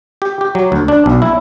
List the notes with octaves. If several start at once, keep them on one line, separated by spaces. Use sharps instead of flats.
G4
G4
F#3
D2
D4
B1
E4